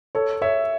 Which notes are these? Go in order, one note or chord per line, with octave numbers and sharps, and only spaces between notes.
A4 C#5
C#5 E5